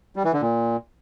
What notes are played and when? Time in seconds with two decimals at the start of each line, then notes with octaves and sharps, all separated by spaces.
0.16 G3
0.25 E3
0.33 D3
0.42 A#2